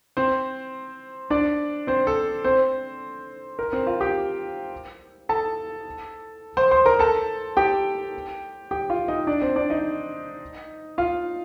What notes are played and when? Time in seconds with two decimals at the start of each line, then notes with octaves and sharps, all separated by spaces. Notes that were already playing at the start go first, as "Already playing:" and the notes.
0.17 C4 C5
1.30 D4 D5
1.87 C4 C5
2.07 A4
2.44 C4 C5
3.59 A#4
3.73 C4 C5
3.87 F4 F5
4.01 G4 G5
5.29 A4 A5
6.57 C5 C6
6.71 C5 C6
6.86 A#4 A#5
6.99 A4 A5
7.57 G4 G5
8.71 G4 G5
8.90 F4 F5
9.08 D#4 D#5
9.27 D4 D5
9.41 C4 C5
9.56 D4 D5
9.70 D#4 D#5
10.98 F4 F5